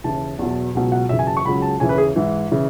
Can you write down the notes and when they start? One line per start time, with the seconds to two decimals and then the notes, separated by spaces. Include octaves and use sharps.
0.04 D#2 C#3 E3 A5
0.39 E2 B2 F#3
0.75 C#2 B2 F#3
0.92 F#5
1.09 F#2 C#3 E3 E5
1.19 G#5
1.27 A5
1.37 C#6
1.45 C#2 C#3 F#3 B5
1.62 A5
1.80 D#2 C#3 E3 G#5
1.89 B4
1.98 G#4
2.16 G#2 E3
2.51 C#3 E3